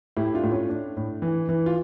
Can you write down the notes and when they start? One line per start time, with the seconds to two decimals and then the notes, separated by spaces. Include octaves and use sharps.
0.17 A2 E4 G4
0.34 D4 F4
0.43 A2
0.52 C#4
0.69 A2 D4
0.97 A2
1.22 E3
1.49 E3
1.66 F4